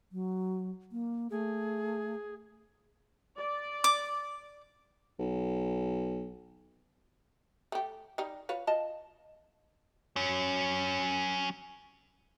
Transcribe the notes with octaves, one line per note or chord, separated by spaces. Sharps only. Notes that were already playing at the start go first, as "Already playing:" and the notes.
F#3
A#3
A3 G#4
D5
D6
B1
A3 G4
G3 D#4
F4 B4 C#5
F4 D#5 A5
F#3 C#4